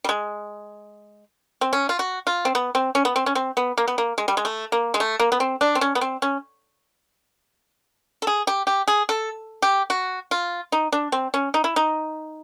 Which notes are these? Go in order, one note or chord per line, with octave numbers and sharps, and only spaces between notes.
G3
G#3
C4
C#4
F4
F#4
F4
C4
B3
C4
C#4
B3
C4
C#4
C4
B3
A#3
B3
A#3
G#3
G3
G#3
A3
A#3
G#3
A3
A#3
B3
C4
D4
C4
C#4
B3
C4
C#4
A4
G#4
G4
G4
G#4
A4
G4
F#4
F4
D#4
D4
C4
C#4
D#4
E4
D#4